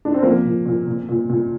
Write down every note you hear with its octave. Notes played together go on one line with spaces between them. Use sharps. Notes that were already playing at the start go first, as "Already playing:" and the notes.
D4
C4
F3 A#3
A#2
A#2
A#2
A#2
A#2